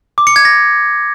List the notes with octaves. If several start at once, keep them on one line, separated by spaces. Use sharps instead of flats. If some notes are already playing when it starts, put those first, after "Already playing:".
D6
C#7
G#6
A#6